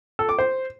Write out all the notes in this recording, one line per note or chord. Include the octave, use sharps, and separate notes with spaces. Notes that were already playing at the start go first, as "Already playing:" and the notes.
A4
D6
C5